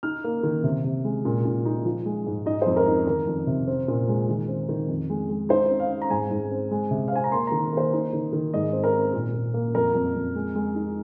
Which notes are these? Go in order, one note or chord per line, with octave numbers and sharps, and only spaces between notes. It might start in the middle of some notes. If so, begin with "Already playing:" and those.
D#4 F6
A#3
D#3
C3
C3
G#3
A#2
A#2
D#4
F3
G#3
G#2
D#4 D#5
F2 C5
A#4
D#4
D#3 A#4
F2
C3
C4
A#2
G#3
D#3
C4
D#3
F2
G#3
G#3
D#4 C5
C4
F5
C4
A#5
G#2 G#5
G#2
C4
G#3
C3
F5
C4 G#5
A#5
A#3 C6
D#3 A#5
A#3 C5
D#4
D#3
D#3
G#2 D#5
C4
A#4
C4
A#2
A#2
A#3
F2 A#4
F2
F2
G#3
G#3
D#4